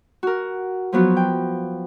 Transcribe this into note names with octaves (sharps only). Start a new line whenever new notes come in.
F#4 A#4
F3 F#3 B3 F4 F#4
G5